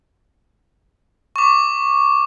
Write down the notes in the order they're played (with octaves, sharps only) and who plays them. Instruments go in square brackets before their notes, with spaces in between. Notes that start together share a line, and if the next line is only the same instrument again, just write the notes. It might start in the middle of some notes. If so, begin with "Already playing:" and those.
[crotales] C#6 D6